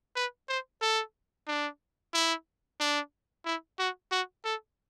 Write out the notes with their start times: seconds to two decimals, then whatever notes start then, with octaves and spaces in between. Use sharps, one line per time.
0.16 B4
0.49 C5
0.82 A4
1.48 D4
2.14 E4
2.80 D4
3.46 E4
3.79 F#4
4.12 F#4
4.45 A4